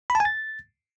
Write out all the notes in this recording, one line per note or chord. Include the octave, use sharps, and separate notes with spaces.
B5
A5
G#5
A6